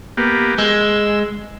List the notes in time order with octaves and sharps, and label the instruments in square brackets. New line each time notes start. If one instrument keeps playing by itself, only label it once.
[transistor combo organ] A#3 B3 G4
[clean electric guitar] G#3 [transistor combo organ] E6